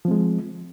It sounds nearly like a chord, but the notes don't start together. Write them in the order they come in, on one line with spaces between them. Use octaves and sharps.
F3 C4 G#3